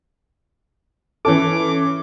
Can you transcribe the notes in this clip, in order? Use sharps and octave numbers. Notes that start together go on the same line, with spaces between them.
E3 C#4 A4 D6